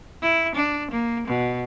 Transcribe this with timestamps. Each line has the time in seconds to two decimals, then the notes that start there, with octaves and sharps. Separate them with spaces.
0.22 E4
0.55 D4
0.91 A#3
1.28 B2